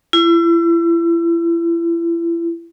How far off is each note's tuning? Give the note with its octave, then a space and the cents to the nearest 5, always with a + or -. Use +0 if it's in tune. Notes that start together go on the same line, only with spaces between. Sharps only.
E4 +35